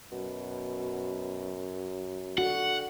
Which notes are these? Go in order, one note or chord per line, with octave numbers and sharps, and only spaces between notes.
F#2 B2
D3 F#4 F#5